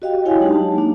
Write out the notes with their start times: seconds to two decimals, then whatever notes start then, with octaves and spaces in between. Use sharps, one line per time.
0.02 F#4 G4 D#5 F5 G5
0.25 E4 F#4 C#5 F5 G5 G#5
0.40 F#3 G#3 D4 D#4 G4
0.52 A5
0.75 A#3 D4